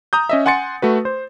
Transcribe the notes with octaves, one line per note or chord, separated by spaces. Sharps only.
A#5 D#6 G6
C#4 D#5 E5
F#5 G#5 C6 A6 C#7
A3 F#4 B4
C5